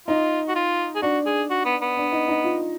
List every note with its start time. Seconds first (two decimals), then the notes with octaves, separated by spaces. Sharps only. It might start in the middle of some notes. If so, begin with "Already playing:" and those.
0.07 D#4 F4
0.48 F#4
0.55 F4
0.95 G#4
1.02 D4 F#4
1.26 G#4
1.50 F#4
1.65 B3
1.82 B3
1.97 D4
2.12 D#4
2.28 D#4
2.44 F4